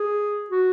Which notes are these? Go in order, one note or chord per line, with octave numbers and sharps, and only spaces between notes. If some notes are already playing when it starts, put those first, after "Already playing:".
Already playing: G#4
F#4